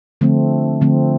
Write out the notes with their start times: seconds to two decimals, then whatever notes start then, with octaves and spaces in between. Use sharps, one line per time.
0.21 D3 F3 A3 C4
0.81 D3 F3 A3 C4